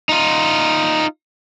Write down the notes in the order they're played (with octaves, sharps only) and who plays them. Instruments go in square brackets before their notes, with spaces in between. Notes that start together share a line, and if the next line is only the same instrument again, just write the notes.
[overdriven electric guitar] D#4 F4